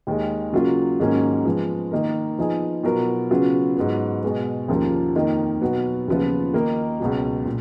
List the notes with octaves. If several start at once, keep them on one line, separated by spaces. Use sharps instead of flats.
D#2 D#3 G#3
C#3 F#3 A#3 F4
G#2 D#3 F#3 A#3 C#4
F3 G#3 B3
D#3 A#3 D#4 A#4
F3 B3 D#4 G#4
B2 F#3 B3 F4 A#4
C#3 F#3 B3 F4
G#2 F#3 B3
B2 G#3 B3
D#2 C#3 F3 A#3 F4
F2 D#3 A#3 D#4
B2 F#3 B3 F#4
D#2 C#3 F3 B3 F4
D#3 A#3 D#4 A#4
C#2 B2 F#3
A#2